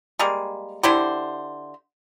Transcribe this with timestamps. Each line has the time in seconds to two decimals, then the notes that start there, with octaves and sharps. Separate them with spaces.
0.19 G3 G#3 A#3
0.83 D3 E4 G4 C5